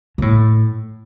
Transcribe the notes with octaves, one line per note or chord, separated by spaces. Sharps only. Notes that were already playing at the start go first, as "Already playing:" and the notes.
B2
A2